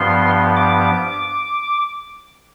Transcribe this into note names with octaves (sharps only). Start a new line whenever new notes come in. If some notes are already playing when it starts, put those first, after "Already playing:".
Already playing: G2 F3 B3 C6
D6